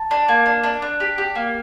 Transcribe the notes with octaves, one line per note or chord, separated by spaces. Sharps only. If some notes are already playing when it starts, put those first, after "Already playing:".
Already playing: A5
D4
A#3
D4
D4
D4
G4
G4
A#3